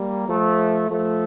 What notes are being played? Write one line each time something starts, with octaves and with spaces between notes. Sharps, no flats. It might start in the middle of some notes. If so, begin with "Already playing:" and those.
Already playing: G3 A#3
F3 A3
F3 A3